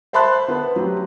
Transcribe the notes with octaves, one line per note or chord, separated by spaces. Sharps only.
C5 E5 A5 B5 C6 F#6
B3 B4
F#3 G4